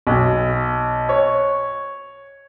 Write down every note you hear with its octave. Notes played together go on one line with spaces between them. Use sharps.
B1
C#5